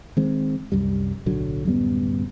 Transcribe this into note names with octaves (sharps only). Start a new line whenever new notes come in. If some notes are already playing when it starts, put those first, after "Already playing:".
D#3 G#3 C4
C2 F#2 G3
D1 B1 D3 F#3
D1 F#2 G3 B3